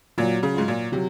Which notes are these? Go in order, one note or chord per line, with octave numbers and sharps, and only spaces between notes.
A#2 F#3
C#3
G#2 F4
A#2
C3 F#3